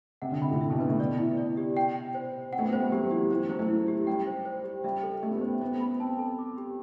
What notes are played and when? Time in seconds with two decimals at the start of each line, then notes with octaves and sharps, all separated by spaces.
0.22 C3 F#5
0.32 D3
0.42 C3 B5
0.51 A2
0.61 E5
0.70 B2
0.80 D3 B4
0.89 A3
0.99 B3 D5
1.19 E4
1.37 D5
1.57 G4
1.77 G5
1.96 G5
2.15 C5
2.33 C5
2.53 C4 F#5
2.59 A3
2.62 B3
2.73 G3 C5
2.82 A3
2.92 F#3 G4
3.10 E3 G4
3.31 E3 C5
3.49 F#3 C5
3.59 A3
3.69 E4
3.88 G4
4.07 G3 G5
4.27 C5
4.46 C5
4.64 G4
4.84 G3 E5
5.03 A4
5.23 A3 G4
5.31 B3
5.38 A3 C5
5.61 B3 C5
5.81 B5
6.00 C4 A5
6.19 A4
6.38 D6
6.57 G4